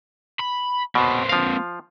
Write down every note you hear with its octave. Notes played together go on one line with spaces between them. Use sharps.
B5
B2 A#3 C4
F3 F5